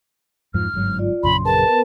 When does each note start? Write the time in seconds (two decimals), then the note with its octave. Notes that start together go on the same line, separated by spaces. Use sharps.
0.54 F2 G#2 F3 F6
0.74 G1 G#2 F#3
0.99 F4 D5
1.23 A#1 F#2 C#3 B5 C6
1.45 G#4 A#4 B4 A5
1.67 B3 A#4 B4